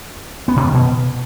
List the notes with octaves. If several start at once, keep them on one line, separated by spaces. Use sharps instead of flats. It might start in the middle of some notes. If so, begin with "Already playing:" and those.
B3
C3
D#3
B2